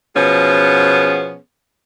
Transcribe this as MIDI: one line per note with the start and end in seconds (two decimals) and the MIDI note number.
0.15 1.37 47
0.15 1.37 53
0.15 1.37 59
0.15 1.37 61
0.15 1.37 68